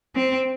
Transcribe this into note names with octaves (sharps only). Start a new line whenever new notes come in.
C4